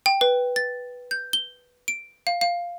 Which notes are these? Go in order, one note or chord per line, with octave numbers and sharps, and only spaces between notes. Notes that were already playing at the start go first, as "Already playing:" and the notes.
G5
B4
A6
G6
G7
D7
F5
F5